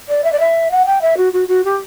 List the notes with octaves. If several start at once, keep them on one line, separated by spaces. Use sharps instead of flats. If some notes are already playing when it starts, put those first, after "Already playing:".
D5
E5
D5
E5
F#5
G5
E5
F#4
F#4
F#4
G4